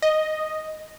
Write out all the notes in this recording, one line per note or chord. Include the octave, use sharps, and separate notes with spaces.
D#5